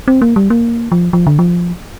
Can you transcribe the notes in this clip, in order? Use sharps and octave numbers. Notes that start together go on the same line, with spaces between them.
C4
A#3
G3
A#3
F3
F3
D3
F3